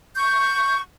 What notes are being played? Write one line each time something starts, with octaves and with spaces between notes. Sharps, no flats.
C#6 G6